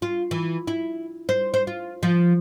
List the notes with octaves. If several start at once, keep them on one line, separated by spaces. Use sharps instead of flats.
F4
E3
E4
C5
C5
F4
F3